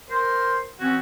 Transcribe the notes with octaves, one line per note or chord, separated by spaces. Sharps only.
A#4 C5
E3 C4 C#4 F#4